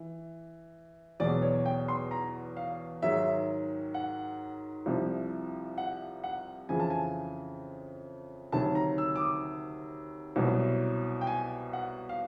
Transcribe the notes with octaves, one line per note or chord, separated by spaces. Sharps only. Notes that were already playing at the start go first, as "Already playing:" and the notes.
Already playing: E3
E2 B2 F#3 D5
C#5
G5
C6
A#5
F5
G#2 D#3 F#3 E5
F#5
C2 C3 F3
F#5
F#5
F2 C#3 E3 G#5
A5
G#5
D2 C3 D#3 F#3 A5
A#5
E6
D6
D#6
C2 B2 F#3
G5
G#5
F#5
F5